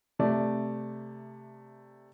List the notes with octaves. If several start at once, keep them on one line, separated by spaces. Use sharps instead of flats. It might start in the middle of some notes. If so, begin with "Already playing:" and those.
C3 A3 D5